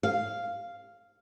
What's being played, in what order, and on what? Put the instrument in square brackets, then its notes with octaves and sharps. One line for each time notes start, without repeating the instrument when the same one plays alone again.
[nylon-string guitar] F5